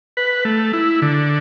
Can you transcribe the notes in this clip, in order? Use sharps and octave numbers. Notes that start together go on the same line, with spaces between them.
B4
A3
E4
D3